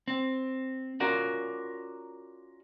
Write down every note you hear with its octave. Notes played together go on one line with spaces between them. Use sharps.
C4
C#4 F4 F#4 A#4 D5